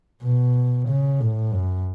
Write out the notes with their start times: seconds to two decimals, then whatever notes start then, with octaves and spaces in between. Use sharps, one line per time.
0.23 B2
0.88 C#3
1.21 A2
1.53 F#2